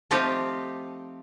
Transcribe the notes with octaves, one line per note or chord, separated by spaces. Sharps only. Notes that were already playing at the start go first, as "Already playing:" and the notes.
F3 A3 C4 D#4 F4 G4